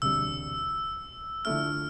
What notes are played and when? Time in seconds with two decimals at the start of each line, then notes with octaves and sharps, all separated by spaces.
0.02 E1 D2 C3 G3 D4 E6
1.45 D3 F3 A3 E4 F6